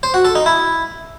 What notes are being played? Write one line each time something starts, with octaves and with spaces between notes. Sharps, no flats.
C5
F#4
A4
D#4
E4